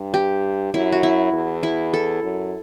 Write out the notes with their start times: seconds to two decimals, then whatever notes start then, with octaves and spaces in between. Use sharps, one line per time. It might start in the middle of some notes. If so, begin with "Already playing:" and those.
Already playing: G2
0.14 G4
0.74 F#2 E4
0.92 F#4
1.03 E4
1.33 E2
1.63 E4
1.94 A4
2.23 F#2